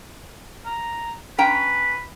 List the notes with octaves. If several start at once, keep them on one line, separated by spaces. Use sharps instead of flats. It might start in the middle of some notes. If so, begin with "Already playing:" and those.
A#5
C#4 B4 G5 A#5